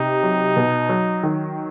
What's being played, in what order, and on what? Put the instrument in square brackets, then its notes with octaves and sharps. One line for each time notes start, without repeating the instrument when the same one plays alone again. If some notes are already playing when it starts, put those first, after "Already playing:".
Already playing: [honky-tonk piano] C3 [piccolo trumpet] D#4
[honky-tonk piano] F#3
B2
F#3
D#3